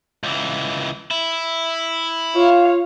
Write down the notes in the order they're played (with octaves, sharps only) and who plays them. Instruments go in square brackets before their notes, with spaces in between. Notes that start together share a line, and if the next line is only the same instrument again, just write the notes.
[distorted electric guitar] C#2 E3
E4
[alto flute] F4 [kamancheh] C#5 F5